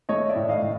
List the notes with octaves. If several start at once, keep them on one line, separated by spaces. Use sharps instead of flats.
A3 C#5 D#5
D5 E5
A2
D#5 F5
A2